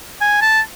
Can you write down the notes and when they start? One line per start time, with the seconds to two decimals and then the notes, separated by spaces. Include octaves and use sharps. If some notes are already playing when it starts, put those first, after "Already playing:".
0.21 G#5
0.42 A5